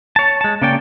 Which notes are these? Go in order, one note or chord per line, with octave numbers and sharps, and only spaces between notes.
C#5 A5
G#3 A5
C#3 A#3 C#5 D5 G5